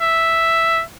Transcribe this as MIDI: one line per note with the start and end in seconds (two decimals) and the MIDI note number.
0.01 0.81 76